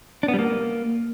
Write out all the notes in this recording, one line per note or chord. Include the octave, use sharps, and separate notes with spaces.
D4
B3
G3
A#3